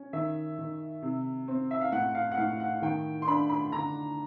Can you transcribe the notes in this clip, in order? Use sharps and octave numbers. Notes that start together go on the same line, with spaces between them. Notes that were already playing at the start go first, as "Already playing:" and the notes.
Already playing: C#4
D#3 E5
D#3
C3
C4
E5
F5
A2 F#5
F5
F#5
A2 F5
F#5
D#3 G5
C6
D4 B5
B5
D3 A#5